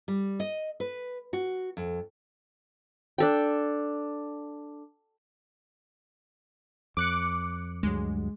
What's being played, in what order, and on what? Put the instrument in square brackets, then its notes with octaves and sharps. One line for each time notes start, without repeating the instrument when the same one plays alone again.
[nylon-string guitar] G3
D#5
B4
F#4
F2
[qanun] D4 A4 G5
[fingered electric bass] F2 [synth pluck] D6 F#6 C#7
[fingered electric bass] D2 G2 F#3 [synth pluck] G#3